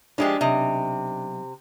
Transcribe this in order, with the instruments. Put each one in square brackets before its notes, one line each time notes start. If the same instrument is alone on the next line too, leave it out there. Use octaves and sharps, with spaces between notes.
[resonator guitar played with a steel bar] F3 G#3 G4 [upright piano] D4
[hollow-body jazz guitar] B1 D#5 E5 [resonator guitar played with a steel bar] C3